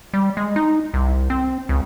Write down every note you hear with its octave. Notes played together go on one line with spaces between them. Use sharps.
G3
G#3
D#4
C2
C4
C#2